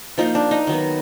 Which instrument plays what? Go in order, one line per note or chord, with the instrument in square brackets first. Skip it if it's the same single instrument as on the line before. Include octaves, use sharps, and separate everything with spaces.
[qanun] F3 A#3 D#4
D4
D#4
D#3 F#3 B3